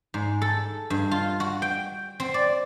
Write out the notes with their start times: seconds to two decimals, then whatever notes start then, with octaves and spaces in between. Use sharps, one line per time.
0.14 G#2
0.42 A4
0.90 G2
1.11 F4
1.40 F#4
1.62 G5
2.20 C4
2.34 D5